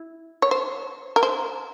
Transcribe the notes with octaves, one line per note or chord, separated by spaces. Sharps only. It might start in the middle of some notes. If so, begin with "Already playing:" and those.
Already playing: E4
C#5
C5
A#4
C5